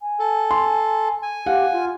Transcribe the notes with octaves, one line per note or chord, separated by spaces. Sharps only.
G#5
A4
C6
G#5
G4 F5 F#5
F4